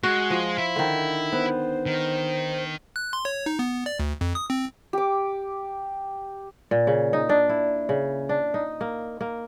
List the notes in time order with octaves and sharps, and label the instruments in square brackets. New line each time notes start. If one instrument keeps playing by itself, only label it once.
[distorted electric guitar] G#3 [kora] F#4
[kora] F3
[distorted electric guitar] E4
[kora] D3 D#3
[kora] B3 [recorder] C5
[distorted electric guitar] D#3
[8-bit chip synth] F#6
C6
C#5
D#4
B3
D5
D2
F2
D#6
C4
[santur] G4 D6
[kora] A#2
C#3
D#4
D4
E4
C#3
D4
D#4
A#3
A#3